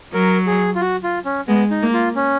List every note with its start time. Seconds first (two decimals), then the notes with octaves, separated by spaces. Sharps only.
0.14 F#3 A#4
0.47 G#4
0.75 F4
0.81 F#4
1.03 F4
1.25 C#4
1.48 G#3 B3
1.70 D#4
1.82 A#3
1.93 F4
2.16 C#4